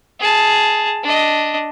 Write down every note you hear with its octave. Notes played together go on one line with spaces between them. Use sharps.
G#4 A5
D4 D#5